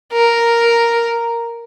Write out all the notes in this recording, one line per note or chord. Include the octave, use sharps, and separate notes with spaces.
A#4